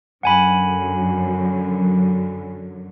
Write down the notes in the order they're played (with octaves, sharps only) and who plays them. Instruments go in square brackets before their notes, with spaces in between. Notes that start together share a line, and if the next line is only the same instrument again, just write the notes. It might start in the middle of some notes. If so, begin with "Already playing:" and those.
[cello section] F#2 D3 F#3 [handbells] F#5 G#5 B5